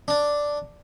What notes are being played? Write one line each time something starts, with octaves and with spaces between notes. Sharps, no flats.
D4